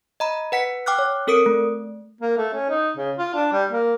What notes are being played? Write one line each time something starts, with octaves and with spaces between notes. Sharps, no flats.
D#5 A#5 B5
B4 F#5 B6 C#7
G5 D6 F6 F#6
C#5
C4 A4 A#4 D#6 C#7 D7
A3
A#3
A3
C#4
D#4
C#3
F4
D4
G3
A#3